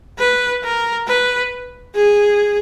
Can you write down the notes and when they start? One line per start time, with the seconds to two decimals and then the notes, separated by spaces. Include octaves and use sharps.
0.19 B4
0.63 A#4
1.08 B4
1.95 G#4